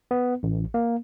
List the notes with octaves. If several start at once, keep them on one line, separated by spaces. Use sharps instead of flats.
B3
A1
A#3